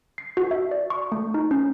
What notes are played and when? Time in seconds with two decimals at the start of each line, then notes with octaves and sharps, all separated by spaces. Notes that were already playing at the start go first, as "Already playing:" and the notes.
0.18 C7
0.37 F#4
0.51 E5
0.71 D5
0.90 C#6
1.12 A3
1.34 D#4
1.51 C#4